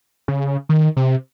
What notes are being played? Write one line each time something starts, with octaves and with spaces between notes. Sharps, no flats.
C#3
D#3
C3